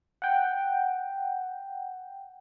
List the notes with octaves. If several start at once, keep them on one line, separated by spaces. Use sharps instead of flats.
F#5 G5